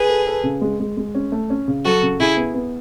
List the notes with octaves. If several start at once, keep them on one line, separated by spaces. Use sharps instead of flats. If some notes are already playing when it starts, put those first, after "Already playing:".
Already playing: G#4 B4
A4
A4
C#3
G#3
G#3
G#3
C#4
A3
C#4
C#3
F#3 F#4 A4
C#3
C#3 E4 G#4
B3
B3